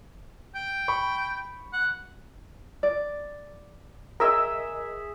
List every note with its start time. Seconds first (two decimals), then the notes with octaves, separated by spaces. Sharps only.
0.55 G5
0.88 B5 C#6
1.73 F#5
2.83 D5
4.20 G#4 A#4 D#5 E5 E6